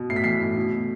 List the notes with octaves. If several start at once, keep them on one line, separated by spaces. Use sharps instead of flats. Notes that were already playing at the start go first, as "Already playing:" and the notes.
Already playing: B2
A2 C7
B6
E3 C7
A2
B2
B2